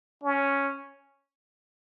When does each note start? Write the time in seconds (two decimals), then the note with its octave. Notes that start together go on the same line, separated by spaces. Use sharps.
0.23 C#4